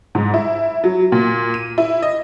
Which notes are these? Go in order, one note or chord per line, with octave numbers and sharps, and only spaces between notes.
G#2
E4
F#3
A#2
D#7
E4
D#5